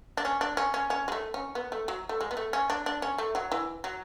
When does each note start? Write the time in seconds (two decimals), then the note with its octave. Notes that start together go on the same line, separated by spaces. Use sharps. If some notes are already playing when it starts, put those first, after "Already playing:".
0.17 D4
0.25 C#4
0.41 D4
0.57 C#4
0.74 C#4
0.90 C#4
1.08 G#3
1.12 A3
1.34 C#4
1.55 B3
1.72 A3
1.88 F#3
2.09 A3
2.21 G#3
2.31 B3
2.37 A3
2.53 C#4
2.70 D4
2.86 D4
3.02 C#4
3.18 A3
3.35 F#3
3.52 E3
3.84 F#3